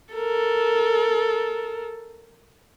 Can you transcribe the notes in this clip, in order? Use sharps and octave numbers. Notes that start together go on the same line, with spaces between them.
A4 A#4